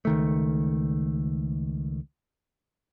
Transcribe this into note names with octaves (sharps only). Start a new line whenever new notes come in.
C#2 D#3 A3